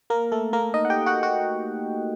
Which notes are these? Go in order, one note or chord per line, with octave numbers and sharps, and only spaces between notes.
A#3 A#4
A3 A4
A#3 A#4
D#4 D#5
F#5
G4 G5
F#4 F#5
F#4 F#5